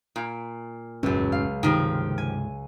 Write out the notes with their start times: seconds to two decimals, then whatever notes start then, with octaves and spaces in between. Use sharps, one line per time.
0.16 A#2
1.03 E1 C#2 F#2 A2 C#4
1.32 F5
1.63 G2 C3 D#3 F3 G#3 G4
2.18 G#5